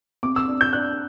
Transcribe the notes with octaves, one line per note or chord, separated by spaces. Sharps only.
C3 D6
E6
D4
G6
D4 F#6